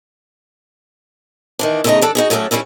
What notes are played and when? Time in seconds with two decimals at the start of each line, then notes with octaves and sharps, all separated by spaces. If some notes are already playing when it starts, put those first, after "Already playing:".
1.59 D#3 E3 D4
1.84 E2 C#3 A3 D#4 D#5 A#5
2.02 E3 D4 A4
2.15 D#4 F#4 G#4
2.30 A2 F#3 A3 C#4 D4 A4
2.51 E3 F#3 G3 C#4 E4